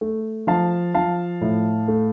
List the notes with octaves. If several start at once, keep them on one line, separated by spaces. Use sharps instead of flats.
A3
F3 F5 A5
F3 F5 A5
A2
A3